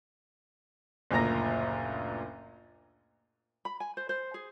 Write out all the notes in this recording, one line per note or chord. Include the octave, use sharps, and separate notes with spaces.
F#1 D2 A#2 A#5 A#6
B5
G#5
C5
C5
G#4